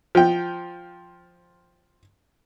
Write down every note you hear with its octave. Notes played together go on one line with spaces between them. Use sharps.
F3 G5